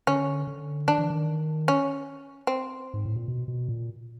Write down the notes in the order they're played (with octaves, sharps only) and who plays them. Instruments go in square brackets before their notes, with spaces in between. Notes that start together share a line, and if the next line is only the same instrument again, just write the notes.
[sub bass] D3 [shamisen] C#4
[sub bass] D3
[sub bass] D#3 [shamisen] D4
[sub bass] E3
D#3
[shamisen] C#4
C4
[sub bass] G#2
A2
A#2
B2
B2
A#2